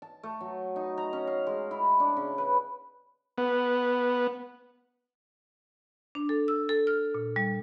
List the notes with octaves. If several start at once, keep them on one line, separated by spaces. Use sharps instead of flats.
A5
A3
F#3
D#4
A#5
C#4
F5
G#3
E4
D4
C#3
B4
B3
D4
A4
E6
A4
F6
A#2
G3